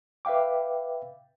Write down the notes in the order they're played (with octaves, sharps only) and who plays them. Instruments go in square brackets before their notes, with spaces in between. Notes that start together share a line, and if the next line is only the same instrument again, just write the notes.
[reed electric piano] B4 E5 F5 G5 D6